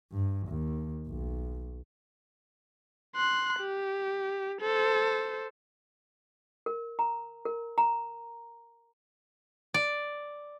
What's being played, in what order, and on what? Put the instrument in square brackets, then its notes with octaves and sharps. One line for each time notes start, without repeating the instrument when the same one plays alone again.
[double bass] G2
D#2
B1
[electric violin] C6 F#6
G4
A4 C5
[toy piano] A#4
A#5
A#4
A#5
[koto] D5